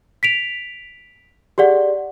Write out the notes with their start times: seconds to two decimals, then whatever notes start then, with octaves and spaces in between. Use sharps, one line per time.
0.23 B6 D7 F7
1.58 G4 G#4 D5 F#5